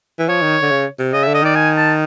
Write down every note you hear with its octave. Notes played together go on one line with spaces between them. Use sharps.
E3
F3 C#5
D#3
D3
C#3
C3
C#3 D#5
E5
D3
D#5
D#3 D5
G#5
A5